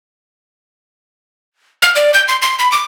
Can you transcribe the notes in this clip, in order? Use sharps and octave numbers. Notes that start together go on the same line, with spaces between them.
F6
D5
G6
C6
C6
B5
D6